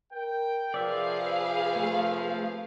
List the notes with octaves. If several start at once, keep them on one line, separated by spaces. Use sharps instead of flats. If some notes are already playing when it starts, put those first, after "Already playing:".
A#4 G5
C3 F3 G#4 B4 D5 E5 F5
A3